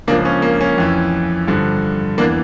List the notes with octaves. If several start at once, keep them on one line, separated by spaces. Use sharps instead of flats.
C#2 C#3 F3 A#3 D4
C#4
A#3
C#4
F2 E3
G2 D3 F3
E2 E3 A#3 D4